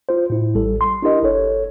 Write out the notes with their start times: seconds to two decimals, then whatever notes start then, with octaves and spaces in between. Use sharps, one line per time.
0.09 F4 C5
0.30 A2 E4
0.54 A1 G3 A4
0.81 C6
1.02 D4 E4 G4 A#4 D#5
1.23 G1 A4 C#5